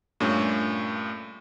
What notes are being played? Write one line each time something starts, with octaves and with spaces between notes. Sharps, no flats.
G2 A#2 A3 C#4